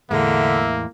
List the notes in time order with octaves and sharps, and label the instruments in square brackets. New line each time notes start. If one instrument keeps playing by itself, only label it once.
[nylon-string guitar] E2 A2 G#3 [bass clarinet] D3 [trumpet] A#3 [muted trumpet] E5